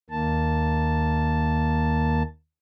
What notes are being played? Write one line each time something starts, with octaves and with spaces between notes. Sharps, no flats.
D#2 D#3 A#3 A5